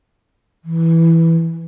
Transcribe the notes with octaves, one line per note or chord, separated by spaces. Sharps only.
E3